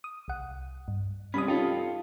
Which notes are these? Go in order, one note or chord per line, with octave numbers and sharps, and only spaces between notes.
D#6
C2 F#5
G2
C3 G3 C#4 B5 D#6
C#4 D#4 F4 G4 A4